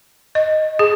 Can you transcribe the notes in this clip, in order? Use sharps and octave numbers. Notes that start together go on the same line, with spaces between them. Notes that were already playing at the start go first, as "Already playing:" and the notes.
D#5
G#4